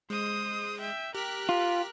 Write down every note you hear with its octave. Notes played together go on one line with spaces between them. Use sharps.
G#3 C5 D#6
E5 G5
G4 A#4 F#6 B6
F4